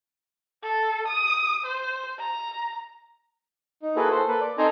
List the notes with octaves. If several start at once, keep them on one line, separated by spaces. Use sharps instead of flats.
A4
D#6
C5
A#5
D#4
A#3 E4 F#4 G#4 A4 B4
A4 C5
A#3 A4 B4
D5
C4 D#4 A4 C5 G#5 A#5